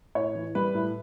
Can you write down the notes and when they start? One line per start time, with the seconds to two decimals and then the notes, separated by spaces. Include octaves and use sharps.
0.15 A2 C#5
0.35 E3
0.55 G3 B4
0.74 A2